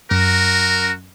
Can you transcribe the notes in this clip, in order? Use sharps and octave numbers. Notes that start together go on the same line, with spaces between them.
F#2 F#4 A#4